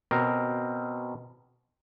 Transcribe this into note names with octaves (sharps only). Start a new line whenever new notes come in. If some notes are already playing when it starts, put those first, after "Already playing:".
B2 C4 A#4